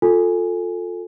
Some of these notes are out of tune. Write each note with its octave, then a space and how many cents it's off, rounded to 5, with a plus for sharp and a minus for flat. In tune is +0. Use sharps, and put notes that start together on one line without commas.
F4 +25 A4 +10 G#5 +0